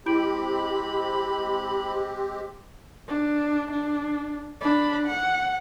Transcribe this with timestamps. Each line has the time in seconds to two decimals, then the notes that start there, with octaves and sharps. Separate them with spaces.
0.06 G#3 C4 E4 G4 B5 G6 D7
3.08 D4
3.71 D4
4.61 D4 B5
5.05 F#5